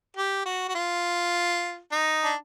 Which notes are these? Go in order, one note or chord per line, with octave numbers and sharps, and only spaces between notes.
G4
F#4
F#4
F4
D#4
D4